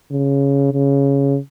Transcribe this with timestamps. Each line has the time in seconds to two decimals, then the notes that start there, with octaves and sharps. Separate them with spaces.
0.11 C#3
0.73 C#3